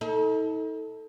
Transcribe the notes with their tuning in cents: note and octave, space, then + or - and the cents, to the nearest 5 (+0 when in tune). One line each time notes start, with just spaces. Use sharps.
D#4 +40 A4 +0